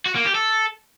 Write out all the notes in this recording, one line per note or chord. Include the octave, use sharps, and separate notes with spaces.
F#4
A#3
G4
A4